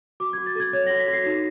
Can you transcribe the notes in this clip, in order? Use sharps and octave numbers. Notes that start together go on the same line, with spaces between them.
F#4 D6
F#4 G#6
A6
A4 G#6
C#5 G#6
F#4 A#6
B6
F#4 C7
D#4